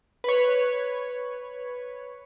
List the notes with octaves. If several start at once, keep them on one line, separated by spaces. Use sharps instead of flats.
B4 C#5